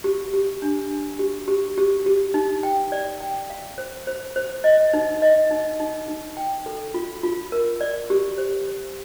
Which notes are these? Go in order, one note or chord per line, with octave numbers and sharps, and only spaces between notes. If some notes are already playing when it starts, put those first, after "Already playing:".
G4
G4
D4
D4
G4
G4
G4
G4
D#4
G5
D5
G5
F5
C5
C5
C5
D#5
D#4
D#5
D#4
D#4
D#4
G5
A4
F4
F4
A#4
D5
G4
C5
C5